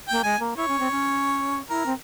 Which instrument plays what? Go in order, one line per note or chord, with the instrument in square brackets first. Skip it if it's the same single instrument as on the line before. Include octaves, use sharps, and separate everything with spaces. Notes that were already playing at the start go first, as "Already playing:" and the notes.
[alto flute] A#3 [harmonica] G5
[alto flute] G#3 [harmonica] G#5
[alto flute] A#3
[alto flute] E4 [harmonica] C#5
[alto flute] C#4
C4
C#4
[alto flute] E4 [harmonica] A#4
[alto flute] C4